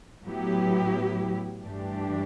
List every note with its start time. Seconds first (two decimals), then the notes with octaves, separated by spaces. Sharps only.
0.24 A2 F#3 B3 E4 G4
1.61 G2 E3 A3 D4 G4